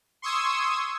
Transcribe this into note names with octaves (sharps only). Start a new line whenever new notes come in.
C6 C#6 D#6 E6 G#6